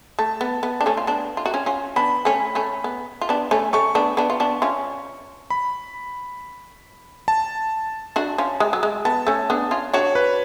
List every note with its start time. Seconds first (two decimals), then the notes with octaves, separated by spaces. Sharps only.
0.19 A3 A5
0.41 B3
0.63 B3
0.81 D4
0.86 A3 C#4
0.97 F4
1.07 B3 D4
1.37 F4
1.46 F#4
1.54 C#4 F4
1.66 C#4 F4
1.96 B3 D4 B5
2.25 A3 C#4
2.55 A3 C#4
2.84 B3
3.21 F4
3.29 B3 D4
3.51 A3 C#4
3.73 A3 C#4 C#6
3.95 B3 D4
4.17 B3 D4
4.30 F4
4.40 B3 D4
4.62 C#4 F4
5.50 B5
7.28 A5
8.16 D4 F#4
8.38 C#4 F4
8.60 G#3
8.73 F#3
8.83 G#3
9.05 B3 A5
9.27 A3 C#4
9.50 B3 D4
9.71 C#4 F4
9.93 D4 F#4 C#5
10.15 B4